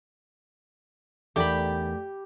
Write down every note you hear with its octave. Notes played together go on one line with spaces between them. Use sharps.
E2 A3 D#4 G4 A#4 D5 G5 B5